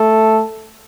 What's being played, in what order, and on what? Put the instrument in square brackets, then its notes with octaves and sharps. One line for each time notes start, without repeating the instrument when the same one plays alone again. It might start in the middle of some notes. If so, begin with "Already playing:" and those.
Already playing: [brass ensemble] A3 A4